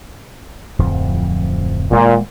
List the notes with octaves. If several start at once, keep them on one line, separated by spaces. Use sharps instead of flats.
D1 F2 F3
D#1 A#2 G#3 A#3